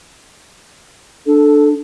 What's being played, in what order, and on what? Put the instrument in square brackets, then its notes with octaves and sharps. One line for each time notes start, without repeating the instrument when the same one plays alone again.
[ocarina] D4 [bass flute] A4